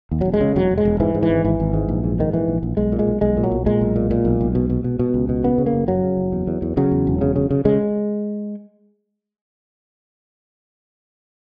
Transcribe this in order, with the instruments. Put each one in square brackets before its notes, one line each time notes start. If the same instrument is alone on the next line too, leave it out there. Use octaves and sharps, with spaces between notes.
[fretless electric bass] D#2
E1 F#3
G#3
C#3
E1 F#3
E1
G#3
E1
G#2 E3
G#2
E3
G#1
G#1 E3
G#1
G#2
A#1
G#2
G#2 D#3
A#1 E3
A#1
A#1
B1 G#3
A#2
G#3
B1
B1 G#3
A#2
F#3
B1
A#2 G#3
B1
A#2
A#2
B1
B1
B2
B2
B2
B2
C#2
B2
C#3 B3
C#3
A#3
F#1
F#2 F#3
C#3
F#1
E2
E2
E2
C#3 F#3
E2
E1
C#3
C#3
C#3
C#3 G#3